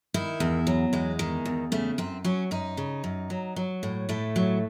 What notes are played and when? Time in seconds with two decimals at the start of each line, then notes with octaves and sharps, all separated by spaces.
0.14 D#3 E4
0.40 E2
0.67 F#3
0.93 E2 G#3
1.19 D#3
1.46 E2
1.72 C#3 A3
1.98 F#2 C4
2.25 F#3 C#4
2.51 F#2 D#4
2.77 C#3
3.04 F#2
3.30 F#3
3.56 F#3
3.83 A2
4.09 A2 A3
4.36 F#3